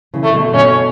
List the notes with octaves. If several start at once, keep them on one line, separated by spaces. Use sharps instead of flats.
C#3 E3
A3
B2 D3
B2 D3 C#4